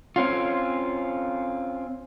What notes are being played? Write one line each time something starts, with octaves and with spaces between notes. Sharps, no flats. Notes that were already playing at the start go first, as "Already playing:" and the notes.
C4 C#4 F4